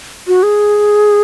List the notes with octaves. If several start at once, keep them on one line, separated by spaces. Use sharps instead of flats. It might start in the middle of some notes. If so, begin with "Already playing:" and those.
F#4
G#4